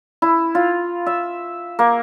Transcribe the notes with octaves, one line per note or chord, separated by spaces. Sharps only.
E4
F4
E5
A#3